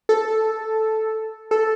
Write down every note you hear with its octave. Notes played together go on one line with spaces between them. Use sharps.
A4
A4